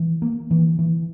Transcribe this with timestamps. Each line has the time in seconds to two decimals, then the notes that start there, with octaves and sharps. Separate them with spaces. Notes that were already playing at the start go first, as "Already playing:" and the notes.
Already playing: E3
0.22 A#3
0.51 E3
0.79 E3